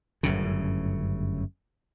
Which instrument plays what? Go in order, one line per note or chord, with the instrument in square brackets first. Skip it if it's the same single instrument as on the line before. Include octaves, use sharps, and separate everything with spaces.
[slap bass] G1 F#2 A2 C#3